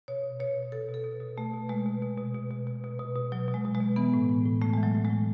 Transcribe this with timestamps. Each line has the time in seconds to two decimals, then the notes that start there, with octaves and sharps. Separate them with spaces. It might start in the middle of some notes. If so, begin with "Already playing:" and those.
0.08 B2 C#5
0.23 B2
0.39 B2 C#5
0.56 B2
0.72 B2 A4
0.88 B2
0.94 A4
1.04 B2
1.21 B2
1.37 B2 A3
1.53 B2
1.69 B2 G#3
1.86 B2
2.02 B2
2.18 B2
2.35 B2
2.51 B2
2.67 B2
2.84 B2
2.99 B2
3.16 B2
3.32 B2 F#3
3.48 B2
3.54 G#3
3.65 B2
3.75 G#3
3.80 B2
3.96 E3 B3
4.14 A2
4.29 A2
4.45 A2
4.62 A2 A3
4.74 E3 G#3
4.83 F#3
4.94 A2
5.05 A2 G#3